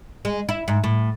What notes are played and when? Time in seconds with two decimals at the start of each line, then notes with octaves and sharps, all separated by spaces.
0.25 G#3
0.49 E4
0.68 G#2
0.84 A2